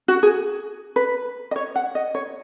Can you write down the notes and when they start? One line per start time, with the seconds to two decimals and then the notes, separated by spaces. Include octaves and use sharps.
0.08 F#4
0.23 G#4
0.96 B4
1.51 D#5
1.56 C#5
1.76 F#5
1.95 D#5
2.15 C#5